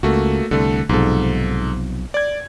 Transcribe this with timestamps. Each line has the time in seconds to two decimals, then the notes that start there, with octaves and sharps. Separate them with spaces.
0.03 C#2 A3 A#3 F#4
0.51 C2 D3 A3
0.89 B1 G#2 C3 F3 A4
2.14 D5 G#6